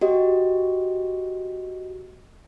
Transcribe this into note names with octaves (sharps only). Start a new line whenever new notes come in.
F#4 G4 D#5